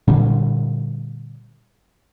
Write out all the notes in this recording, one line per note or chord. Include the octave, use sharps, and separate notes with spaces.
A#2 D3 G3